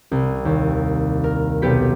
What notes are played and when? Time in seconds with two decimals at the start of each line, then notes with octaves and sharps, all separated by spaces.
0.11 C2
0.45 D#2
1.24 A#4
1.62 B1 B3 G4 G6 B6